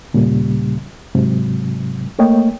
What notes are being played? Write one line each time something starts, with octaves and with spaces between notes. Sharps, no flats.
D#2 A#2 C#3 G3
G#2 C3 F#3
A3 A#3 C#5 D#5 G5